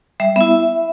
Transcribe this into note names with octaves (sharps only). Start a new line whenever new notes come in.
G3 E5
B3 E4 E5